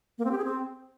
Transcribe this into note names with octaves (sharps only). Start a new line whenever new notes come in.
A#3
C4
G4
G#4
C4